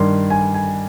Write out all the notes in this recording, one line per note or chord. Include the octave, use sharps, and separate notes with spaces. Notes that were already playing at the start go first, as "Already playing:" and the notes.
Already playing: G2 D#3 C6
G#5
G#5